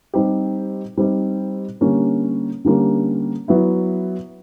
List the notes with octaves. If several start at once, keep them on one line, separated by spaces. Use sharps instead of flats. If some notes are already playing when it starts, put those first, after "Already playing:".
G3 C4 D#4 G4
G3 C4 D#4 G4
D3 G3 A#3 C#4
D3 G3 A#3 C#4
F#3 B3 E4